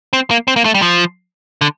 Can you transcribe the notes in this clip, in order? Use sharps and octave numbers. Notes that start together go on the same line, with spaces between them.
C4
A#3
C4
A#3
A3
G3
F3
D3